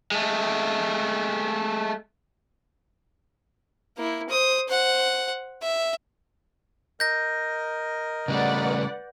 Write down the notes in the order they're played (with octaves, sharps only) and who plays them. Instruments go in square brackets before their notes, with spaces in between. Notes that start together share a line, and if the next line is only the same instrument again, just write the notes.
[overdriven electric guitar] G#3 A3
[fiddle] A#3 E4
C5 D#6
C5 F#5
E5
[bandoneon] A#4 D#5 [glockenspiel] G6 A#6
[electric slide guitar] C#3 G3 A3 [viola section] B4 D5 F#5